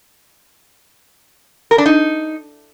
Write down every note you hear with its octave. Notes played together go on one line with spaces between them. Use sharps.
A#4
D4
D#4